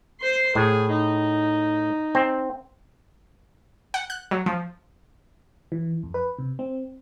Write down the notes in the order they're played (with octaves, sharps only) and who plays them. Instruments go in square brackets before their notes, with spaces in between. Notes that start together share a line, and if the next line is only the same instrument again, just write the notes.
[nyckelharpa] C5 C6
[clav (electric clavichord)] A2 [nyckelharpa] G#4
[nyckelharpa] D#4
[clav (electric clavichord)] C4
[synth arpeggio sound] F#5
F#6
F#3
F3
[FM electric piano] E3
F2
B4
C3
C4